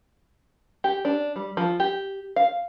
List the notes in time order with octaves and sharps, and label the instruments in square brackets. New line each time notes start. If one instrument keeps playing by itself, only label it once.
[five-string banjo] G4
D4
G3
F3
G4
F5